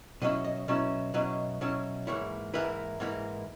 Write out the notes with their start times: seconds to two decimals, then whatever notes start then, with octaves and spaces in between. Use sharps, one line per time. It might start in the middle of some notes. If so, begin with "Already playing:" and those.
0.22 B2 F#3 C#4 E4 D#5
0.45 D#5
0.68 B2 F#3 C#4 E4
1.14 B2 F#3 C#4 E4 D#5
1.61 B2 F#3 C#4 E4
2.07 G#2 E3 A#3 E4 C#5
2.54 G#2 E3 A#3 E4 B4
3.00 G#2 E3 A#3 E4